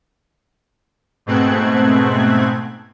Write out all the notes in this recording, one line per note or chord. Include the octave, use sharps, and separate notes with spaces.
G#2 B2 A3 C4 F#6 G#6